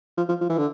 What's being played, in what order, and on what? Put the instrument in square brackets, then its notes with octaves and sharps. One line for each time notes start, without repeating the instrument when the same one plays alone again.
[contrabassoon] F3
F3
F3
E3
D3